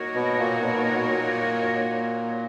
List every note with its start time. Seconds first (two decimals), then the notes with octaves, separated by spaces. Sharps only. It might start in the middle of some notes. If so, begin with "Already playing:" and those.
Already playing: A#3 D#4 F#4 A#4 C#5
0.15 B2
0.38 A#2
0.60 B2
0.82 A#2
0.94 B2
1.07 A#2